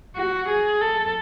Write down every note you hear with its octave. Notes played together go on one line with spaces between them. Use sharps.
F#4
G#4
A4